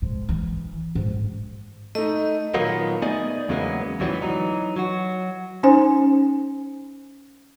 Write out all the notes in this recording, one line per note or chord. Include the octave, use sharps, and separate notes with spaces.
G#2
E3
G#2
A3 D#4 D#5
A#2 D#3 F#3 A#3 B3
A3 B3 D#4 G#4 D5 D#5
E2 C#3 F#3 G#3 A#3 B3
D2 G#2 E3 F#3 G3 B3
E3 F#3 D#4
F#3 F#4
C#4 D#4 C5 G#5